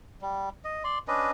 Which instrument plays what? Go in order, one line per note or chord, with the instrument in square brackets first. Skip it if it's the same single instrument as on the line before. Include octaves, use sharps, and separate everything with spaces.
[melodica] G3
D#5
D5 C6
C#4 D4 B4 D#5